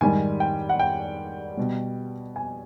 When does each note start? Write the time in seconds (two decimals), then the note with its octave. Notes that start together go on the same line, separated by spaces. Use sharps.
0.01 G#2 D#3 G3 G#5
0.40 G5
0.69 F#5
0.79 G5
1.57 B2 G3
2.36 G#5